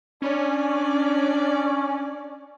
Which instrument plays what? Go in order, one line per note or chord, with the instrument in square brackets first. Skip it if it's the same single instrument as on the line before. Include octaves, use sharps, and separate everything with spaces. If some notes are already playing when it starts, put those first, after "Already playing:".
[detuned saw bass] C#4 [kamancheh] D4 D5